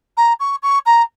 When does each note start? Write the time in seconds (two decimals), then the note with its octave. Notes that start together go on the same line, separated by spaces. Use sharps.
0.17 A#5
0.40 C#6
0.62 C#6
0.86 A#5